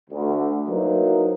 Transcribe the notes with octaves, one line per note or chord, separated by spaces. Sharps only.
D2
F#3 A#3 D#4 E4 B4 C5